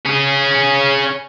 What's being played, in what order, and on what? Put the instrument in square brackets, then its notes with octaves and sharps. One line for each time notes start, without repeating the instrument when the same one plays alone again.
[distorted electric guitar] C#4 G#4